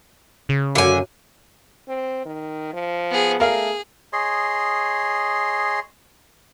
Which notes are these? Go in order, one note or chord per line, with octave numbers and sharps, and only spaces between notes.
C#3
F#2 D3 F#4 F5 G#5
C4
D#3
F3
B3 G#4
A3 G#4 A#4 F5
G#4 C#5 D#5 C6